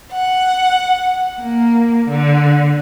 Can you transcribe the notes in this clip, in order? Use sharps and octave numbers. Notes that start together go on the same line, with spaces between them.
F#5
A#3
D3